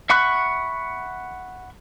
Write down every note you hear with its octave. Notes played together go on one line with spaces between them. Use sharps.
E5 F#5 B5 C#6 F#6